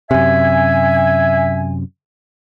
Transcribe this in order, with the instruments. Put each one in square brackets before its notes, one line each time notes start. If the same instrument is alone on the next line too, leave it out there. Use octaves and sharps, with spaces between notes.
[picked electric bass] F#2 C3 [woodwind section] E5 G#5